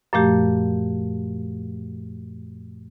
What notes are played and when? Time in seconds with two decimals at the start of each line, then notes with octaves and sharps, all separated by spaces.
0.13 F#2 A#2 F3 A3 G4